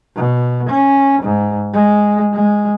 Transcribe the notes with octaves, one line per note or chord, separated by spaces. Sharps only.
B2
C#4
G#2
G#3
G#3